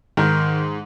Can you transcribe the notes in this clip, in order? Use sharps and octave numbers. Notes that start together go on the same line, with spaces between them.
G#2 D#3